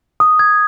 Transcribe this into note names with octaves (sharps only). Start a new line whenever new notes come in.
D#6
G#6